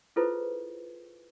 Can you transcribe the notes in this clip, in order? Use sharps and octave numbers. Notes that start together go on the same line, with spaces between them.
E4 F4 G#4 A4 B4 C5